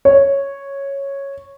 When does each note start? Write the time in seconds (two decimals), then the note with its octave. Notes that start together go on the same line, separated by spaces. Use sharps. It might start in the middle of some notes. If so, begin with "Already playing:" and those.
0.05 C#5